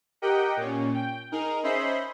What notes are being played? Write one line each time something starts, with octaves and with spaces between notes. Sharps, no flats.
G4 A#4 D#5 F#5 G5
A#2 C#4
G5
D#4 G#4 A#4
C#4 C5 D#5 E5 B5 C6